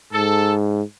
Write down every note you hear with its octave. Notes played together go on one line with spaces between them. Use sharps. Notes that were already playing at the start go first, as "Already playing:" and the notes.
G#2 A4